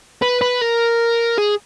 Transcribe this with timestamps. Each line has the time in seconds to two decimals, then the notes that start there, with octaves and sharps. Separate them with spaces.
0.22 B4
0.42 B4
0.62 A#4
1.38 G#4